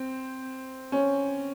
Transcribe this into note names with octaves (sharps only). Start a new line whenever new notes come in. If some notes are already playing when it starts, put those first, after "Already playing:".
Already playing: C4
C#4